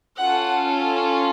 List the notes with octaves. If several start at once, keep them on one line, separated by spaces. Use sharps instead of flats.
C#4 F4 A4 F#5